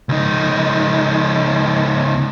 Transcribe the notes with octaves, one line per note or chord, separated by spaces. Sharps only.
C#2 D#4